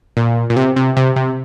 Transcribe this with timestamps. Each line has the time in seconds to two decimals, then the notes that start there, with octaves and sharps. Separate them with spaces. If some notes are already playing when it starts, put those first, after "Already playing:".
0.17 A#2
0.50 A#2
0.56 C3
0.76 C3
0.97 C3
1.16 C3